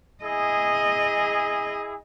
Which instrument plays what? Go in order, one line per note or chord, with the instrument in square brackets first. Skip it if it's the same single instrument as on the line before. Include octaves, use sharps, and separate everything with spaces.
[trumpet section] E4 G#4 [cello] D#5